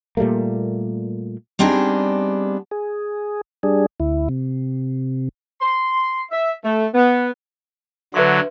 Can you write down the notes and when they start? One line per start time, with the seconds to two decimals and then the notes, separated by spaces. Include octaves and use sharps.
0.17 A#2 G3 A3 A#3
1.59 G3 B3 C4 D4 D#4 G#4
2.71 G#4
3.63 G3 D4 G#4
4.00 D2 E4
4.29 C3
5.61 C6
6.31 E5
6.64 A3
6.94 B3
8.14 D3 F#3 B4 E5 C6